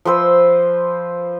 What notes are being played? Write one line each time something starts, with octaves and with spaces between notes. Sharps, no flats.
F3 B4 C5 E6